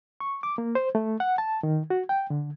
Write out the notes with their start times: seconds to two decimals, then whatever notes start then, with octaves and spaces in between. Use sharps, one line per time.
0.20 C#6
0.43 D6
0.58 A#3
0.75 C5
0.95 A3
1.20 F#5
1.38 A5
1.63 D#3
1.90 F#4
2.09 G5
2.30 D3